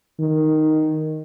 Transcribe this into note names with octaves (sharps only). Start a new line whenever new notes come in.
D#3